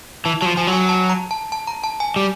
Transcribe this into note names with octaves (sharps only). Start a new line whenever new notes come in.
E3 A5
F3 F#3 A5
F3 G#5
F#3
G#5
A5
A#5
A5
A5
A#5
A5
G#5
G3